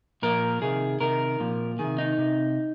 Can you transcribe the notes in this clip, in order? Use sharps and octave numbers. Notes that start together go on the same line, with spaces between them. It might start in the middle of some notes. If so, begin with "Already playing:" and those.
A#2 F3 A#4
C3 D#3 G#4
C3 D#3 A#4
A#2 F3
C3 D#3 G#4
D#4
C3